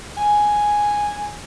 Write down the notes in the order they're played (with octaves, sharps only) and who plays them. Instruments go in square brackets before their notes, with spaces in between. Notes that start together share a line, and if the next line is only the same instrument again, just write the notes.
[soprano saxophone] G#5